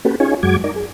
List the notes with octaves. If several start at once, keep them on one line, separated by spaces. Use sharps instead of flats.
A#3 C#4 F#4 G4 A4 B4
C#4 D#4 F4 G#4 C#5 G#5
F#2 F#3 G#3 F#4 D6 G#6
D#4 A#4 D5
G#4